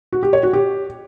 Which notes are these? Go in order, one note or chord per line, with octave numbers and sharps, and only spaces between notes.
F#4
G4
C#5
F#4
G4